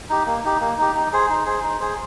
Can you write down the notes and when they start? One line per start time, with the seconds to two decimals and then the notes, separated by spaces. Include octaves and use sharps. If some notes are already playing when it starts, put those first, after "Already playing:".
0.10 D#4 G4
0.26 A#3
0.45 D#4 G4
0.61 A#3
0.78 D#4 G4
0.95 D#4
1.13 G#4 C5
1.30 D#4
1.46 G#4 C5
1.63 D#4
1.80 G#4 C5